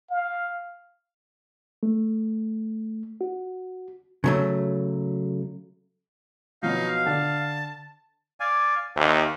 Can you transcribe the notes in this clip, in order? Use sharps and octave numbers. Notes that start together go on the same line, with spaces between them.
F5
A3
F#4
C#3 F#3 A3
B2 F3 F#3 D#4 F5
D3 A5
D5 F5 G#5
D#2 G4 E5